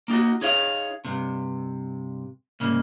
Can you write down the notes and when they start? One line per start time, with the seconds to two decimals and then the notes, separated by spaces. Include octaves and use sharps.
0.08 A#3 D#4 F4 F#4
0.41 D#4 G#4 C#5 D#5 F5
1.05 G2 C3
2.60 C2 G#2 C#3 A#3